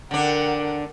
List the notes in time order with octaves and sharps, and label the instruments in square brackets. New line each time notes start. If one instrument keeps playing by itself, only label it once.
[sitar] D3 D4 [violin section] A#4 F#5 G5